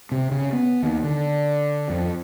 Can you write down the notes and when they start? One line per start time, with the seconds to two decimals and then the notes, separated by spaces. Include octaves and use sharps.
0.11 C3
0.31 C#3
0.52 B3
0.83 D#2
1.03 D3
1.89 F2